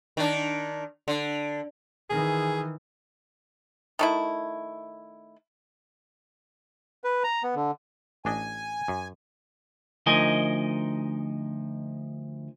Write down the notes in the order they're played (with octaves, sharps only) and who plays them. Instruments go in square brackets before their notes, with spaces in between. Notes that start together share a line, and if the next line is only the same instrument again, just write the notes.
[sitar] D#3 D4
D3
[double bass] D#3 E3 [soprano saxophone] G#4
[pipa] D#3 A3 E4
[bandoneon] B4
A#5
B3
D3
[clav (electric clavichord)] A1 D4 D#5 [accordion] G#5
[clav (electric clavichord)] F#2
[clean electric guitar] D2 F3 D#4 A#4 D#5 G#5